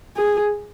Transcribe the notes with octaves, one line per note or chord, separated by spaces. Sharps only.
G#4